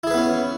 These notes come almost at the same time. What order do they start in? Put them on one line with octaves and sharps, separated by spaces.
E4 G#4 B4 B3 C#4